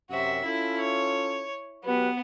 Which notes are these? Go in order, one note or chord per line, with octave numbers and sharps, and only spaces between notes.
F#2 C3 F#4 E5
C#4 E4 F4 A4
C#5
F#3 B3 G4 B4